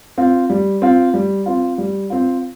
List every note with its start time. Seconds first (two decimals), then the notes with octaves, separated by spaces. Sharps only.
0.18 C4 F4
0.50 G3
0.82 C4 F4
1.14 G3
1.46 C4 F4
1.78 G3
2.10 C4 F4